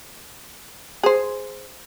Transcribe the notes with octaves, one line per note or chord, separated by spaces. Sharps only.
G#4 C5